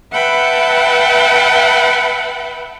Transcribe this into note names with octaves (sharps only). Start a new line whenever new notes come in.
B4 E5 F#5 G5 A5 B5